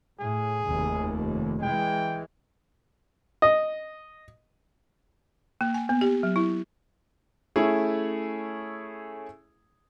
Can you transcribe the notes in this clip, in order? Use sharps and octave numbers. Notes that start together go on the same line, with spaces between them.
A2 G#4
F1 D#2
E3 G#3 G5
D#5
A#3
G#5
B3
G4
F#3
E4
A3 C#4 E4 G#4